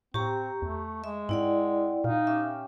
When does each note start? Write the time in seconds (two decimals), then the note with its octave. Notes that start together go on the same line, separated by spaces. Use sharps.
0.14 A2 C4 G4 A#5 C#6
0.62 E2 A3
1.04 G#3 E5
1.29 G#2 C4 E4 D5 F#5
2.04 A#2 D#4 F5
2.27 C#4 G4 E5